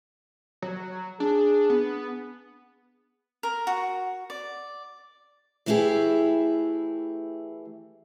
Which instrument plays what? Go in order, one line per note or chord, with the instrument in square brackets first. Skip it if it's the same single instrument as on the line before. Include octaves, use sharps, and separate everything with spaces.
[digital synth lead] F#3
[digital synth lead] D4 [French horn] G#4
[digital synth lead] B3
[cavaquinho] A#4
F#4
D5
[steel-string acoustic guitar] E3 A3 E4 G4 G#4